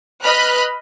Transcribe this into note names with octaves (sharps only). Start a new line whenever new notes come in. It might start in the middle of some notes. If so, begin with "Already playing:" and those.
B4 D#5 B5 F6 F#6